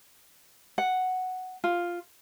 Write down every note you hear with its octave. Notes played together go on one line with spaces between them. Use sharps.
F#5
F4